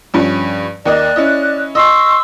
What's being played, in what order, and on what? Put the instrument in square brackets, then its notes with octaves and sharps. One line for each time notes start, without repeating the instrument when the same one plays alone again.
[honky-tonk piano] G2 F3 C#4
[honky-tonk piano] D#2 A#3 D#5 [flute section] D5 F#6
[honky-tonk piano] C#4 E4 D#5
[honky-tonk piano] D#5 [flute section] C6 C#6 E6